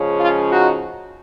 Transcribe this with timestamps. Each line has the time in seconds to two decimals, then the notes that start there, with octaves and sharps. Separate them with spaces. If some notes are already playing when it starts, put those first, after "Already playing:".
Already playing: C#3 F3 G#3 C#4
0.19 F4
0.50 D#4 F#4